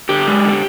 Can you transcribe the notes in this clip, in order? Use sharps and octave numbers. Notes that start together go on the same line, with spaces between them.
D3 G4
G#3
D3